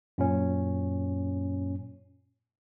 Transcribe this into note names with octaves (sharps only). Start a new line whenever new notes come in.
F#2 A#2 C#4